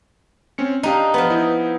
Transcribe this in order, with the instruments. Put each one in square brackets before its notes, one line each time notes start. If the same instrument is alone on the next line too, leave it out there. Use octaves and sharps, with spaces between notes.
[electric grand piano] C4 C#4 C#7
[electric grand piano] D4 G4 F5 [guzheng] D#4
[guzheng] F3 B3
[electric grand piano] D#4 E4